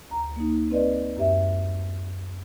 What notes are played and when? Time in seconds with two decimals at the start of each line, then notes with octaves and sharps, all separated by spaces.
0.10 D2 A#5
0.36 A#3 D#4
0.71 C4 B4 D5 D#5
1.17 F#2 G4 E5